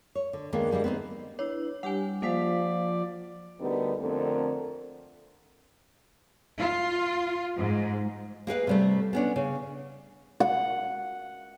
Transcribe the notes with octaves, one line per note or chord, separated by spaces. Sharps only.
C#5
D3
D#2 D#3 G#3 A#3 B3 D4
D3 G3 G#3 A#3 E4
B3 C4 D4 D#4
D4 E4 B4 C#5
G3 D4 G4 F#5 G#5
F3 A#3 F4 C5 D5 F5 F#5 B6
D2 D3 G3 B3 D#4 A#4
F2 D3 A3 C4 A#4
F4
G#2
A#3 G#4 B4 F5
C3 G3 A3
B3 C#4 D4
C#3
F#5